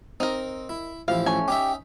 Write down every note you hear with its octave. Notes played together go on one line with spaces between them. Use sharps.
C4 D#4 A#4
E4
A1 F3 E4 F5
A3 C#4 G#5
C#4 D#4 G4 E5